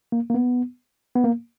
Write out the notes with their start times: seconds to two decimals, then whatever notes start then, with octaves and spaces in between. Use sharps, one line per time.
0.12 A#3
0.30 A#3
0.34 B3
1.15 B3
1.24 A#3